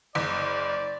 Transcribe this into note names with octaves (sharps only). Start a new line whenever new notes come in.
F#1 D5